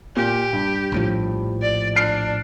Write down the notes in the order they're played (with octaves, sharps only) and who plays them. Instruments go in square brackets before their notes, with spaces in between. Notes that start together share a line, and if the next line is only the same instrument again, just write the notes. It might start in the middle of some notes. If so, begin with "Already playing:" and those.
[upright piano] A#2 [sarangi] G4
[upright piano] G2
[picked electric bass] A#1 A2 F3
[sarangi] D5
[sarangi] D4 [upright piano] F6 C7 D7